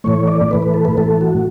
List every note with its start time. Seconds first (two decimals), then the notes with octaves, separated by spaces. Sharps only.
0.04 A2 E3 A3 C#5
0.28 D5
0.51 A2 E3 A3 B4
0.62 B4
0.74 A4
0.85 B4
0.97 A2 E3 A3 A4
1.21 F#4